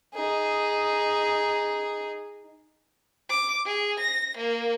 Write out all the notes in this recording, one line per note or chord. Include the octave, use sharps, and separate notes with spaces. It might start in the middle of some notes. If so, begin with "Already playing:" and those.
D#4 G#4
D6
G#4
A#6
A#3